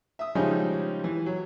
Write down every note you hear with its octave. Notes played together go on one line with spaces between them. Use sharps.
E5 D#6
C#3 F3 G3 G#3 C#4 D#4
E3
F#3